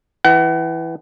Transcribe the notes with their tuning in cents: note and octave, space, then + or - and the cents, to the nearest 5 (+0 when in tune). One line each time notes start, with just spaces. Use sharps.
E3 +0 F#5 +40